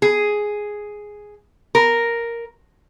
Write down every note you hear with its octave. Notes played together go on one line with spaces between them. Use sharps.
G#4
A#4